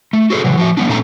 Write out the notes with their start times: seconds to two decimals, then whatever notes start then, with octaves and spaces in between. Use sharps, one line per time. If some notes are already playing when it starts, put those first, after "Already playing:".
0.13 A3
0.30 F#4 G#4 A4 C5
0.44 C#3 E3 F#3
0.57 F3 F#4 E5
0.77 G3 A#3 B3 D4
0.89 A#2 A3 C4 D4 G#5 A#5